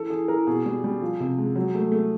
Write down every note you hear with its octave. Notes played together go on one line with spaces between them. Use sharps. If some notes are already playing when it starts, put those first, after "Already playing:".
Already playing: E3 A4
E3 G#4
E3 A#4
B2 G#4
G3
G3
F3
C3
G#3
F#3
A3
A3